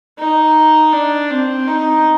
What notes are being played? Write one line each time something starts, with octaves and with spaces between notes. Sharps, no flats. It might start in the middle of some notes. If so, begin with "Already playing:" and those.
D#4
D4
C4
D#4